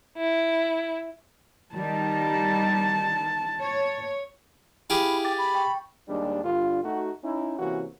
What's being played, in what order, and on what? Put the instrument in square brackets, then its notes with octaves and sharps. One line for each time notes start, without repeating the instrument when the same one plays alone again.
[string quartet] E4
[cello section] D#3 G3 [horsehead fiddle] A5
[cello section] C#5
[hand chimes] E4 D7 [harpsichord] G4 G#4 F5 [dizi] B5
[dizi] G5 [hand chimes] D6 A6
[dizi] B5
[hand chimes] G5 C#6
[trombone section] D#2 G3 G#3 D4
G2 D3 D4 F4
A3 D#4 F#4
C#4 D#4 E4
C3 E3 A#3 C#4 F#4